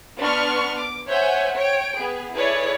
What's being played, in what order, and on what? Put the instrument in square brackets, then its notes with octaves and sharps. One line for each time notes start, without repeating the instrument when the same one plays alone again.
[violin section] B3 D4 B4 C6 C#6 F6
D6
C5 C#5 E5 F#5 G#5 G6
C#5 G5 D7
B3 G#4
E4 G#4 A4 B4 C#5 D5